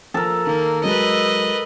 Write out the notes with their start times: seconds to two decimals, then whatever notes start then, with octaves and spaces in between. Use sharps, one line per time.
0.14 F3 A4 A#4
0.47 D#3 A#3
0.84 F#3 G#3 B4 D#5